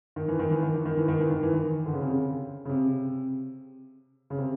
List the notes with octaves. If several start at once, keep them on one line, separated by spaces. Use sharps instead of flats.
D#3
E3
D#3
E3
D#3
E3
D#3
E3
D#3
E3
D#3
E3
D#3
D3
C#3
C3
C#3
C#3
C3
C#3
C3